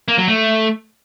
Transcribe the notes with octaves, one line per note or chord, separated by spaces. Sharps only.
A#3
F#3
A3